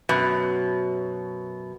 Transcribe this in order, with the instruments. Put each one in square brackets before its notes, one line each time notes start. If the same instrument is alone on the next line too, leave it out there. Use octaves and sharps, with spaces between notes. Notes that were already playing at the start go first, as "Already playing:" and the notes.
[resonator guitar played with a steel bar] F#2 B2